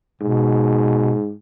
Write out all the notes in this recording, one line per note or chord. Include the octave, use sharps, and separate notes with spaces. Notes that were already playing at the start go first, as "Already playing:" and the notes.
G#2 B2